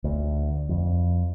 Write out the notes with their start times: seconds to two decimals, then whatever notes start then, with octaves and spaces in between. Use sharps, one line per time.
0.04 D2
0.69 F2